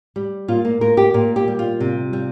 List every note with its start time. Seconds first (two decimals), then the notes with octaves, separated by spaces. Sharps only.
0.16 G3
0.48 A#2 F4
0.65 A#3
0.81 A#2 A#4
0.97 G4
1.14 A#2 A#4
1.36 G4
1.48 G3
1.59 F4
1.80 C3
2.13 G3